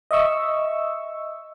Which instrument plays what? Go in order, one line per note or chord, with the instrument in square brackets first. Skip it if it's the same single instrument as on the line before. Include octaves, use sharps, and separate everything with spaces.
[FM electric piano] D#5 E5 C#6 E6